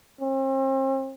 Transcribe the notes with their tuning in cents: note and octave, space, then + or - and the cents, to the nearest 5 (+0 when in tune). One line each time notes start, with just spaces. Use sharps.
C4 +40